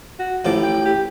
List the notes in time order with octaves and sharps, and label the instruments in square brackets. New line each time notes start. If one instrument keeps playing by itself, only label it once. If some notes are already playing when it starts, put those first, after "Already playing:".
[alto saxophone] F#4
[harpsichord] A1 A2 D6 [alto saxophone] F3
[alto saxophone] G5
G4